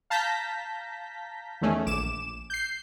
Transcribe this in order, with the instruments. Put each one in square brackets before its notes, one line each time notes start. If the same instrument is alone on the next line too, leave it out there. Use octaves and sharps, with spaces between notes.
[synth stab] F5 A5 A#5 G6 A#6 B6
E2 D#3 A3 C#4 G#4
A#1 D6 E7
G6 C7